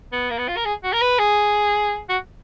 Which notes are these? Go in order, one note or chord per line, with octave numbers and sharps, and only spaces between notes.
B3
A#3
B3
F4
A#4
G#4
F#4
A#4
B4
G#4
F#4